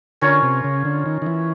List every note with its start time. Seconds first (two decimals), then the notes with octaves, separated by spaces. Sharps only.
0.21 D3 C#4 F4 A#4 C#5
0.42 C3
0.64 C#3
0.85 D3
1.06 D#3
1.22 D#3
1.26 E3